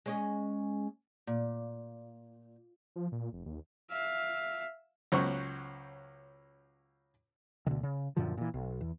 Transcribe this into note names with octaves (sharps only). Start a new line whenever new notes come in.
G#3 C#4 D#5
A#2
F3
A#2
F1
D#2
E5 F5
C#2 F#3 C#4 C5 C#6 F#6
D2 B2 D3 D#3
C#3
F#2 A#2 D3 F3
A#2 E3
B1
E2